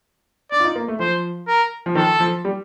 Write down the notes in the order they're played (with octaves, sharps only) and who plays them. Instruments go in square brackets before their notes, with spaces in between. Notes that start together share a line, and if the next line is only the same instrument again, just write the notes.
[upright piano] D4 [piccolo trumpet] D5
[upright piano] F4
D#4
A#3
A3
[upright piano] F3 [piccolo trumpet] C5
[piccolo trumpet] A#4
[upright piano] F3
[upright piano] D#3 [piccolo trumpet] A4
[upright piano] F3
G3